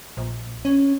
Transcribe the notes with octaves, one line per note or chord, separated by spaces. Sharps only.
A#1
C#4